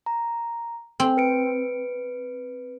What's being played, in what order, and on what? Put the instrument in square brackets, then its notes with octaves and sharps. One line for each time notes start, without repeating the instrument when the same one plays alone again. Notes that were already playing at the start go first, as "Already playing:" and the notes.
[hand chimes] A#5
[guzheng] C4
[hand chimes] B4 C#7 D7